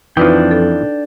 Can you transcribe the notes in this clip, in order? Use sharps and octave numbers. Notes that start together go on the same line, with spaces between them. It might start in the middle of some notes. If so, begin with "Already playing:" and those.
F2 E3 F3 D4 D#4 B4 G5
A4